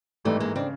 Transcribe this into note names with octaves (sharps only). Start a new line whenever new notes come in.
G#1 G#2 E3 G3 A3
G#3 A#3
C#3 C4 D4